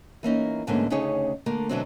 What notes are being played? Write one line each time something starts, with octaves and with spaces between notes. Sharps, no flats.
E3 A#3 C#4 D#4
E2 G#2 D3 A3 A#3 C#4
D2 C#3 C#4 D#4 G#4 C#5
D3 A3 A#3 D4 A#4
B2 D3 E3 F#3 B3 C4